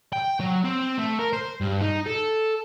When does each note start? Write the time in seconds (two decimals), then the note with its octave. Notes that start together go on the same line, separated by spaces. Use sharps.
0.13 G5
0.40 F#3
0.64 C4
0.98 A3
1.19 A#4
1.33 C5
1.61 G2
1.81 D#4
2.06 A4